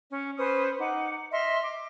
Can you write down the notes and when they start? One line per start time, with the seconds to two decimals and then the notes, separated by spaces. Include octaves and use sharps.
0.08 C#4
0.37 C#4 B4 C5 D#6
0.79 D#4 F#5 D6
1.31 D#5 E5 C6 F6
1.63 D6